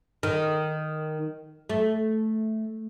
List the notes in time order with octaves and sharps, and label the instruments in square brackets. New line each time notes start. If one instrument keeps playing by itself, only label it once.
[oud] D#3
A3